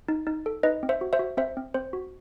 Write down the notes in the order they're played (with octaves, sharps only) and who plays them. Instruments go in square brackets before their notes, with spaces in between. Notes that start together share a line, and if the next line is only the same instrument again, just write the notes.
[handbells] D#4
D#4
A4
D#4 B4 D#5
C4
C5 E5
F#4
C5 E5
F#4
C4 C5 E5
C4
C4 C5
F#4